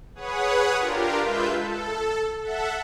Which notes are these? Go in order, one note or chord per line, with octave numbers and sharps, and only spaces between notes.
G#4 B4 C#5 F#5 D#6
D4 F4 G4 A#4
G#3 F4 B4 E5 G6
A4
A4 E5 F#5